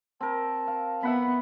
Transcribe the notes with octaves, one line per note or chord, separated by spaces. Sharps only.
C4 A#4 A5
F5
B3 E5 F#5 B5